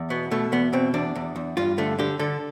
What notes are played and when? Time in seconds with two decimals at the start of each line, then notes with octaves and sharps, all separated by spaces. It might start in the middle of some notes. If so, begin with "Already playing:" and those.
Already playing: E2
0.10 B2 B3
0.31 B2 A3
0.52 E2 B3
0.73 B2 C4
0.94 E2 D4
1.15 E2
1.36 E2
1.57 G2 F4
1.78 D3 A3
1.99 D3 G4
2.19 D3 A4